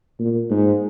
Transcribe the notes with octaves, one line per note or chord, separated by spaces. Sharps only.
A#2
G#2